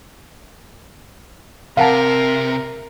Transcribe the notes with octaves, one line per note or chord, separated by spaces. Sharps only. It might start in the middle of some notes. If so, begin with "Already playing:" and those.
C3 A#4 F5 F#5 A5